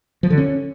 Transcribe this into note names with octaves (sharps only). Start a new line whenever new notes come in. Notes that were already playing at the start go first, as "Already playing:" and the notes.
F3
D3
C#4